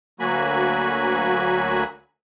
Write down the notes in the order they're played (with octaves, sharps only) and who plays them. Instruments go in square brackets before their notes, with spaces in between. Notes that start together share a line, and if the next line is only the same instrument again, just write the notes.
[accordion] D2 F#3 A#3 F#4 G#5 B5